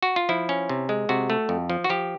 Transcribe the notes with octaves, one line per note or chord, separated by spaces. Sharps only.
F#4
F4
F3 E4
C#4
C3
G#3
C3 F#4
A3
F2
F3
F#4
F3 G4